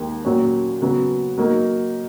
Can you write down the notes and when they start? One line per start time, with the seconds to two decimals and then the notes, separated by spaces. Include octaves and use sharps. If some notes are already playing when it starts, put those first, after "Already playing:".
Already playing: D#2 D#3 G#3
0.25 A#2 F#3 C#4
0.82 C#3 F#3 B3
1.38 F#3 A#3 D#4